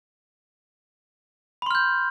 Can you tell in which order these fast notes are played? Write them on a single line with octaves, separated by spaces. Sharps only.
B5 C6 F6 G6